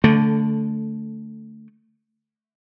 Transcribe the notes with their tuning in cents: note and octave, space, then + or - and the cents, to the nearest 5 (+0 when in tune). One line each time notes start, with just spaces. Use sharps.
D3 -15 A3 +0